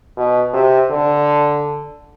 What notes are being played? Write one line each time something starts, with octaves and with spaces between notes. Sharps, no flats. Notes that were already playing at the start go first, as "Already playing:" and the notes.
B2
C3
D3